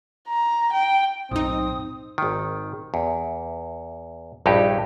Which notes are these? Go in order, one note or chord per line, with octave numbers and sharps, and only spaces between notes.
A#5
G5
B1 F#2 A2 C4 D#4 D#6
G#1 D#3
E2
A#1 G2 D#4 E4 G4